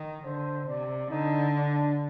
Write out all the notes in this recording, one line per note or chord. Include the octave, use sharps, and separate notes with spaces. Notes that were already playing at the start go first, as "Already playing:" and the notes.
Already playing: D#3
D3 C5
C3 D5
D3 D#4
D4